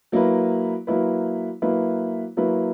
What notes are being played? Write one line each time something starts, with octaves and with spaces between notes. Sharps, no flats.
F#3 A#3 E4 B4
F#3 A#3 E4 B4
F#3 A#3 E4 B4
F#3 A#3 E4 B4